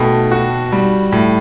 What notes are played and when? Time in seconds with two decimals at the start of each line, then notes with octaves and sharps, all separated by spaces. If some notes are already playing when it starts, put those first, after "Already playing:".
Already playing: B2 A3 G5 A5 B5
0.32 F#4
0.72 G3
1.12 A2